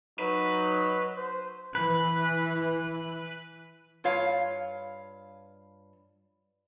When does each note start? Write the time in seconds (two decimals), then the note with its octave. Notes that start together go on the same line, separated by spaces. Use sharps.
0.19 F#3 D#4 B4
1.16 C5
1.75 E3 B4
4.04 G2 F4 C#5 F5